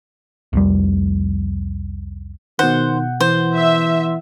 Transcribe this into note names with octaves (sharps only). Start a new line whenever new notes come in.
C2 F2 G3
B2 D#3 C5 F#5
E3 C5
E5